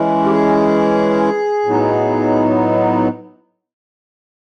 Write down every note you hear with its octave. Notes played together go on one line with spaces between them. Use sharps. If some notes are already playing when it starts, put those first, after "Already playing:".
Already playing: E3 G#3 C#4 E4
G4
G#4
A2 F#3 B3 D#4